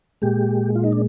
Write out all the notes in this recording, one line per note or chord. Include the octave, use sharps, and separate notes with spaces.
A#2 G#3 G4
F4
D#4
D4